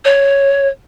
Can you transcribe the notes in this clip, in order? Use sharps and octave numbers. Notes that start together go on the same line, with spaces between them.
C#5